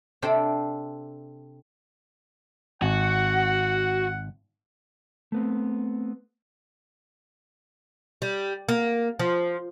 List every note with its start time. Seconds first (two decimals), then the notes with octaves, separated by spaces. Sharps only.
0.22 C3 C4 D4 A4 G5
2.82 G#1 F#4 F#5
5.32 A3 B3 C4
8.22 G3
8.69 A#3
9.19 F3